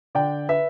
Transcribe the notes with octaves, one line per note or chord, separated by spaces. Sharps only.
D3 D5 G5
B4 E5